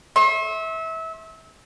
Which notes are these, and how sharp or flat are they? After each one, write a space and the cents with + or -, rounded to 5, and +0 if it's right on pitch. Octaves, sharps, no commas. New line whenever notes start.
E5 -25 C6 +45